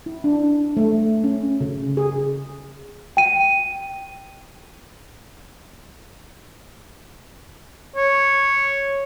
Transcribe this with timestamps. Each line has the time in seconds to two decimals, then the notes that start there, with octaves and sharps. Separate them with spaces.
0.06 E4
0.24 D4
0.77 A3
1.24 C#4
1.61 C#3
1.97 G#4
3.17 G5 D#7
7.96 C#5